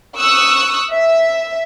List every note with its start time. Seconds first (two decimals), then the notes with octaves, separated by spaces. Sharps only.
0.18 C#6 D#6 E6 F#6
0.92 E5